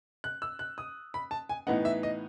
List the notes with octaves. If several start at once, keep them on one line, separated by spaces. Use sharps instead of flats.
F#6
E6
F#6
D#6
B5
A5
G#5
A2 E3 B3 D#4 F#5
E5
D#5